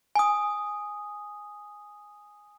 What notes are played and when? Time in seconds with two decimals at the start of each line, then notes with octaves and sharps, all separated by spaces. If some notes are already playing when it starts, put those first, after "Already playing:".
0.15 G#5 D#6